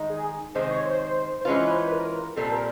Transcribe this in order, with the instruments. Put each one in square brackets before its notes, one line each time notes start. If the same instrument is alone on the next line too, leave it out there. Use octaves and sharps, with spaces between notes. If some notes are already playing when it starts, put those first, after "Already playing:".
Already playing: [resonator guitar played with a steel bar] D#3 G#3 D#4
[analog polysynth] G#4
[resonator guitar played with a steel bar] C3 D#3 G#3 [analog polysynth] C5
[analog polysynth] C#5
C5
C5
[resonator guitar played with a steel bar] E3 G#3 C#4 F4 [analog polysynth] B4
[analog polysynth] B4
C5
B4
B4
A#4
[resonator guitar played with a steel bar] A#2 G3 C4 [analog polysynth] A4
[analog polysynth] A4
A#4